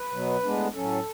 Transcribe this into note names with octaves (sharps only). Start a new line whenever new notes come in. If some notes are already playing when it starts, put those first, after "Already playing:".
Already playing: B4
B2 F#3 B3
A2 G#3 B3 D4
A2 F#3 C#4 A4